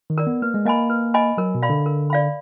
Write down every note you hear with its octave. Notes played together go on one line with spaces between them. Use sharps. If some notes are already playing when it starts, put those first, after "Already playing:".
D#3
A#4 D5
B3
A#3 B4
G#3
A#3 D#5 G#5 B5
B4
D#5 G#5 B5
F#3 A#4
B2
D5 F5 B5
D3
A#4
D5 F5 B5